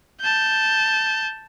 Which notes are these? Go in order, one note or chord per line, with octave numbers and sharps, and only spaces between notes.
A5 G6